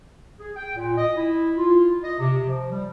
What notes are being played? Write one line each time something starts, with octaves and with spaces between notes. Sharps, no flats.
G#4
G5
A#2
D#5
E4
F4
D#5
C3
F3
G3